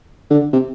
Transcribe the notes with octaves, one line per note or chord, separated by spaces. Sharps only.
D3
C3